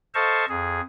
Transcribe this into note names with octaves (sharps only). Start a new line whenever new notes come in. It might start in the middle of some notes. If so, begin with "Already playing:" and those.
A4 C5 D#5 F5 A5 C#6
F2 G#4